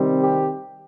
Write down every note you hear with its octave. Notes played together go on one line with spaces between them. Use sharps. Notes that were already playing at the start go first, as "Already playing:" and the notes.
Already playing: C3 D#3 G3 C4
G4